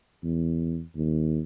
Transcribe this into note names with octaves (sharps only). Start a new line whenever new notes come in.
E2
D#2